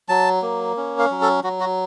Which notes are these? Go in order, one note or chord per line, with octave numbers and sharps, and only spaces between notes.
F#3 A5
A#3
C#4
F5
F#3
A4
F#3 F#4
F#4